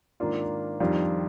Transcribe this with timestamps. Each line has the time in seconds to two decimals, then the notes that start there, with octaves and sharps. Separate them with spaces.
0.20 G#2 D#3 A#3 D4 F4
0.80 F2 D#3 G3 D4 F4